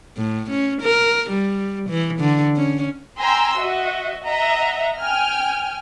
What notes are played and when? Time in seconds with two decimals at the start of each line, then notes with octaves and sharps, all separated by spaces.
0.18 A2
0.51 C#4
0.82 A#4
1.30 G3
1.90 E3
2.20 D3
2.57 C#4
3.17 G5 G#5 A#5 C6 E6
3.57 F#4 D#5 E5
4.22 D#5 E5 F#5 A#5
5.01 G5 G#5 F6